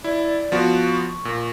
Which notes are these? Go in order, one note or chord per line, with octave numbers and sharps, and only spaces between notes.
E4 D5
F3 B3 F#4
C#6
A#2